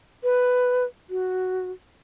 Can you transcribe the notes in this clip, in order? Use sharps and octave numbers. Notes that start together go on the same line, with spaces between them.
B4
F#4